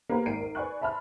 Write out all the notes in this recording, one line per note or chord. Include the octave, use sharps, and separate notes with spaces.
A#3 B3 G4 B4
G#1 A#4 C7 D7 D#7
A#4
B4 D5 G#5 C#6 F#6
E5 A5 B5 C6 F6